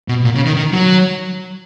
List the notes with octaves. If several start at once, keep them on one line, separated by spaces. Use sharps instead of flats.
B2
A#2
C#3
D#3
D#3
F#3